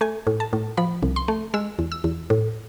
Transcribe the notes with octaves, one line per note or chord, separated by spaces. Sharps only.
A3 G#5
A2
A5
A2
F3 B5
C2
C6
A3
G#3 E6
E2
E6
E2
A2